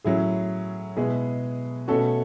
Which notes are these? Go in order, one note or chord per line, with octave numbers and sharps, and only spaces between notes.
A2 F#3 C#4 E4 G#4
B2 G#3 B3 E4 G#4
B2 A3 C#4 F#4 A4